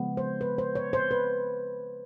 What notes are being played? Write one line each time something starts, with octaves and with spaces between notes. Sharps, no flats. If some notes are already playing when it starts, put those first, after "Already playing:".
Already playing: C#3 F3 G#3 B3
C5
B4
C5
C#5
C5
B4